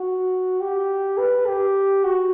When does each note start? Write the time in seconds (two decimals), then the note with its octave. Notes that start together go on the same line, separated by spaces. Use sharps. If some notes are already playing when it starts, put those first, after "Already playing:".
Already playing: F#4
0.61 G4
1.18 B4
1.46 G4
2.04 F#4